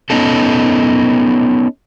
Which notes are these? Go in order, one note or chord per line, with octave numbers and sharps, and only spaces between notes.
B3 C#4 D#4 A4